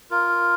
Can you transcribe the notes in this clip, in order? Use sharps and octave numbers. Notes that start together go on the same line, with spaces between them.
F4 A#4